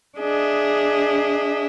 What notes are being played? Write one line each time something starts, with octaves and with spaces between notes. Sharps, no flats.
D4 G#4 D#5 E5